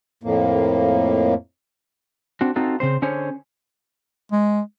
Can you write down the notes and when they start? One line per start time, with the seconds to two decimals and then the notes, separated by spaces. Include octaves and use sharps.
0.23 F2 A2 A#3
2.41 C4 D4 F#4
2.56 C4 D#4 F4 F#4 A4
2.80 C#3 C4 C5
3.02 D3 C#4 G#4 C5 C#5
4.32 G#3